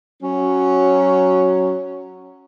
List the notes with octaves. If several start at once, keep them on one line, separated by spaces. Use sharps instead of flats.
F#3 C#4